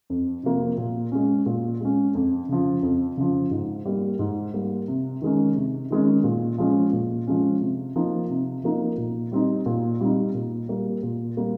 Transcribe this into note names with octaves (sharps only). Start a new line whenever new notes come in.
F2
C3 F3 A#3
A#2
G#3 C#4
A#2
G#3 C#4
F2
C#3 F3
F2
C#3 F3
G#2
G3 A#3
G#2
G3 A#3
C3
D#3 G#3 C#4
C3
D#3 G#3 C#4
A#2
F3 G#3 C#4
A#2
F3 G#3 C#4
C3
F3 A#3 D#4
C3
F3 A#3 D#4
A#2
G3 C4 D#4
A#2
G3 C4 D#4
A#2
G3 A#3
A#2
G3 A#3